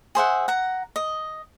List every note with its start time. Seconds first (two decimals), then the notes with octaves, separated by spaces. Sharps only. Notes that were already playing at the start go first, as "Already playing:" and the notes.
0.15 G#4 C5 E5 F#5
0.48 F#5 A#5
0.96 D#5